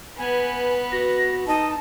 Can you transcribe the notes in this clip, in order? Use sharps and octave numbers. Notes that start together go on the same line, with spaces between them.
B3 B4 G#5
F#4 A#6
D#4 D#5 A5